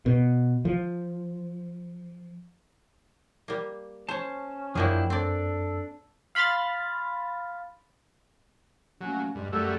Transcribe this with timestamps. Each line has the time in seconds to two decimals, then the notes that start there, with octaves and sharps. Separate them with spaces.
0.06 B2
0.65 F3
3.48 G3 A#3
4.09 C#4 C5 C#5 A5
4.75 F#2 F3 F#3 A#3 D4 E4 G#4 G5
5.10 C4 D4 A4 D5
6.35 F5 B5 C6 F6 A6
9.01 F#3 A3 A#3 C#4
9.35 G2 G#3
9.53 F#2 F#3 G3 A3 E6